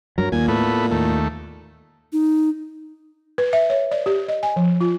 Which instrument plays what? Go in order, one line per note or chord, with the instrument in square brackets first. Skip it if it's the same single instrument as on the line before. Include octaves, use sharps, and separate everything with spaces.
[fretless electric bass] G2 F#3 [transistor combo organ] A#4
[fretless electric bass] D#2 [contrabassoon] A#2 [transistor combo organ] G#5
[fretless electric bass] A2 [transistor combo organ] A3 B3
[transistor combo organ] D#2 A3
[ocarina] D#4
[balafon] B4
E5
C#5
D5
G4
D#5
G#5
F3
F4